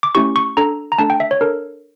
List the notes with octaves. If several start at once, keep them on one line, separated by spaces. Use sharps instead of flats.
D6
A3 C#4 E4 G4 C#6
C#6
D4 A4 A#5
A#5
A3 D4 A4 A5
G5
E5
C#5
D4 A4 A#4